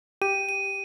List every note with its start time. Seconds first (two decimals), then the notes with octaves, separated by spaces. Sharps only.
0.22 G4 D#7
0.49 D#7